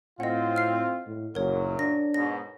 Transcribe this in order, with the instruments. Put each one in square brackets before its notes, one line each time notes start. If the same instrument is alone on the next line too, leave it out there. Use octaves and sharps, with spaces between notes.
[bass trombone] A2 [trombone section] C4 F4 [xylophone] D#5 F#5
[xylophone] F6 C7
[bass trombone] A2
[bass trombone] F#1 [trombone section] F#2 A#2 F#3 [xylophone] A#4 C#5
[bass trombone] D4 [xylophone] A#6
[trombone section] G#2 B2 [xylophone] A#6